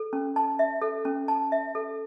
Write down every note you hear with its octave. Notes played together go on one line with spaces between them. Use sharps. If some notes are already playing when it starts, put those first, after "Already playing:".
Already playing: A4
C#4
A5
E5
A4
C#4
A5
E5
A4